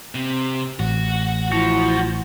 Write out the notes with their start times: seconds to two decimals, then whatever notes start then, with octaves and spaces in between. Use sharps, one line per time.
0.15 C3
0.80 A1 F#4
1.52 F3 E4 F#4